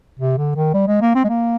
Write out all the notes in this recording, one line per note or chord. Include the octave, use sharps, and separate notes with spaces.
C3
D3
D#3
G3
G#3
A#3
C4
G#3
A#3